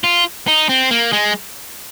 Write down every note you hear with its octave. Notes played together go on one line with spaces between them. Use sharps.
F4
D#4
C4
A#3
G#3